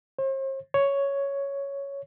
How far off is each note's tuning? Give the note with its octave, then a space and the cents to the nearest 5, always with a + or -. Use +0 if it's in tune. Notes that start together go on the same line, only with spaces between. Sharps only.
C5 +45
C#5 +5